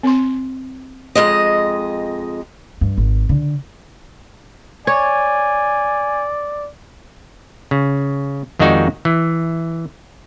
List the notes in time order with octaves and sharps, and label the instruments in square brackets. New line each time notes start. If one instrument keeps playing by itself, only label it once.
[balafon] C4 C6
[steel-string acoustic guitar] F2 G#3 D#5
[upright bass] G2
G#1
D3
[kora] C#5 [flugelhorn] D5 [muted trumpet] G#5
[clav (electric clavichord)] C#3
F2 D#3 G#3 D#4 F#4 D5
E3